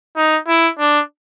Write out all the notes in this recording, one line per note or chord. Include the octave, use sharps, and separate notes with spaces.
D#4
E4
D4